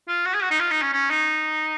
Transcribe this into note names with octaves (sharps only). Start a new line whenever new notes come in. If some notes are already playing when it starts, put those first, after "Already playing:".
F4
F#4
G#4
F#4
D#4
F4
D#4
C#4
C#4
D#4